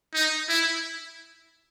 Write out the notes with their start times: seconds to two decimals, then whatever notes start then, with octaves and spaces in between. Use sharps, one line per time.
0.14 D#4
0.49 E4